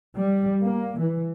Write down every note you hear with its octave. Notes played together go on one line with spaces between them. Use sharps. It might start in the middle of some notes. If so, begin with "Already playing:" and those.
G3
A#3
E3